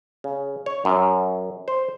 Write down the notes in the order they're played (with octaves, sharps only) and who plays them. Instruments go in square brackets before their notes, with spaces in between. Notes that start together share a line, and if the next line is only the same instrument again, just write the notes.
[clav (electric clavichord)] C#3
C#5
F#2
C5